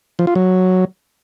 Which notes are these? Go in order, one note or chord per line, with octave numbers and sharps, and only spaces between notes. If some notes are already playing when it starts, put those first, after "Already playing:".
F3
F4
F#3